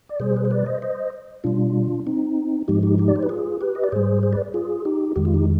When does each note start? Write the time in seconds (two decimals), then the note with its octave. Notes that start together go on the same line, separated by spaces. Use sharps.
0.09 D5
0.20 B2 G3 G#4 C5
0.37 B4
0.45 C5
0.51 B4 D5
0.66 C5 D#5
0.82 C5 D#5
1.44 B2 G3 D4 F4
2.07 C4 D#4
2.68 G#2 F3 G#3 D#4 G4
2.83 D#4 G4
2.98 D#4 G4
3.08 D5
3.16 C5
3.23 B4
3.29 F4 G#4
3.61 G4 B4
3.75 D#5
3.84 D5
3.92 G#2 G3 G#4 C5
4.23 G#4 C5
4.33 B4 D5
4.54 F4 G#4
4.85 D#4 G4
5.16 F2 D#3 G#3 G4
5.25 F4
5.34 D#4 G4